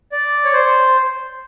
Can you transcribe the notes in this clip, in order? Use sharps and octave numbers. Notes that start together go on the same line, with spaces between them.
D5
C#5
C5